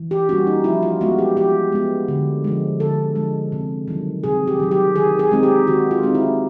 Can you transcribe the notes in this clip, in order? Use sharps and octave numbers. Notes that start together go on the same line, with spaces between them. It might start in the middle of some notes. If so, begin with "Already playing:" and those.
Already playing: E3
G4
G3 A#3 C#4 F#4
D#4
F3 E4
F4
G#3 B3 F#4
G4
F3 G4
G#3 B3
D3
F3 G#3
D3 A4
F3 G#3
C3
D#3 F#3
C3 G#4
G4
D#3 F#3
G4
D#3 G#4
G#4
G#3 C4 D#4
G4
D#3 F#4
F4
G#3 C4 D#4
E4